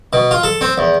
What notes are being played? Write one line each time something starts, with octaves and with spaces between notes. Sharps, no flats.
B2
F4
A4
C4
E2